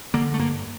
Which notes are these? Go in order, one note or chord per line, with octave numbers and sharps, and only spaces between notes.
D3 A#3
A3
G2 A#3